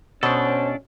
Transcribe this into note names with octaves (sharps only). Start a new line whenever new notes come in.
B2 C#4 D4 A4 C5 C#5 A5